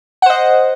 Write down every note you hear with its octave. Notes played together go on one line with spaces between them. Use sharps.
C5 D#5 F#5